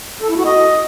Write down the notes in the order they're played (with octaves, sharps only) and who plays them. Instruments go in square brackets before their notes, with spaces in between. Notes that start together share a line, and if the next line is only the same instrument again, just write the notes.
[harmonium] A4
E4
F#4
D#5